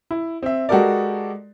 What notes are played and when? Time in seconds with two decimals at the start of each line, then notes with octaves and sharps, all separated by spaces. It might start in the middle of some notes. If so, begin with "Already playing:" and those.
0.11 E4
0.43 C4 E5
0.69 G#3 F#4 G4 A4 A#4 D5